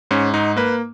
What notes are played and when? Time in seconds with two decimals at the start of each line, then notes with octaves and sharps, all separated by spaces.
0.11 G#2 C#4
0.34 G#2 D#4
0.56 A#3 B4